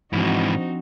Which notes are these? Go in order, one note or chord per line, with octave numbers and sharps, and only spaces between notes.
G#2 E3 F3 C4 D4 D#4 F#4